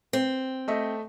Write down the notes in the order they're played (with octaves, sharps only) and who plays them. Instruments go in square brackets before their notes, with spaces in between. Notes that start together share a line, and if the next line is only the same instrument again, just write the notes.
[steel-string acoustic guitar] C4
[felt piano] A3 D#5 E5